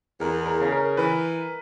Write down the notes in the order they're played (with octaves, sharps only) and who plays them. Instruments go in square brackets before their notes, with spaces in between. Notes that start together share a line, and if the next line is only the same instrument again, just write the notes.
[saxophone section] E2 [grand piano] A#4
[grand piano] A#4
[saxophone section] C#3
[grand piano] A#4
[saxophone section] E3 [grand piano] B4